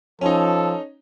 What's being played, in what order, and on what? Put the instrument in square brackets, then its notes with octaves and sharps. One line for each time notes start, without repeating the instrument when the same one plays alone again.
[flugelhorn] F3 [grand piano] C#4 D#4 [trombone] A4